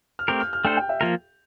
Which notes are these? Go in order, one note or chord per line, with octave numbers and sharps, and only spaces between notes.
F6
A3 C4 G4 A#4 G6
F6
F6
A3 D4 A4 C5 G5
G5
E5
F3 A#3 F4 A#4